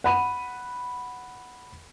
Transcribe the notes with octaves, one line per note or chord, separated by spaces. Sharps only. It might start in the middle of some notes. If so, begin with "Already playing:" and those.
F#5 B5 D#7